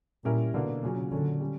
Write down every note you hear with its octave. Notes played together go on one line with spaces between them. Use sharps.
A#2 G3 C#4 E4 G4 A#4
B2 D3 A#3 D4
A#2 C#3 F#3 C#4
A#2 D3 F#3 C#4
G3 C#4